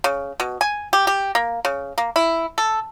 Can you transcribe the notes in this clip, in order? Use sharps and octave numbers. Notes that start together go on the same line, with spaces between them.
C#3
B2
G#5
G4
G4
A#3
C#3
A#3
E4
A4